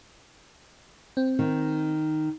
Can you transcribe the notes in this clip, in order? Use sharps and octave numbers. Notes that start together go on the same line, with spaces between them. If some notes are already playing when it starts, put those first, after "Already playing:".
C4
D#3